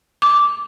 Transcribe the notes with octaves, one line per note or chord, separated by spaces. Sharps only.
D6